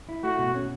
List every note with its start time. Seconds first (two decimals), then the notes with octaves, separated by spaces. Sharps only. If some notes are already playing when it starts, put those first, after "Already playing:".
0.09 E4
0.23 A3 F#4
0.39 B2
0.55 C#4